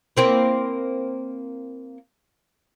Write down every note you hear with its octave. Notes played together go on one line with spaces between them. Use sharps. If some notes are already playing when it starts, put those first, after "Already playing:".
A#3 C4 E4